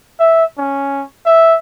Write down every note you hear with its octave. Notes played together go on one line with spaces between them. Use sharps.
E5
C#4
E5